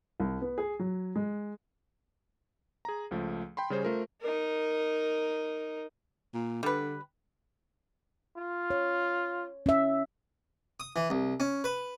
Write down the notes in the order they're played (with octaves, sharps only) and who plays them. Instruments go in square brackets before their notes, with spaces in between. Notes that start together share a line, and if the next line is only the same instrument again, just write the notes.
[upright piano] C2
B3
G#4
F#3
G#3
[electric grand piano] G#4 A#5
C#2 F3 A3
G5 B5 C6
C#3 G3 C#4 G#4 C5
A3 F4 A#4 C5
[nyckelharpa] D#4 A#4
[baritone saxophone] A#2
[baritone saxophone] D3 [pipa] G3 B4
[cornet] F4
[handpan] C#5
C#4 E5
[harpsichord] D#6
E3
C2
C#4
B4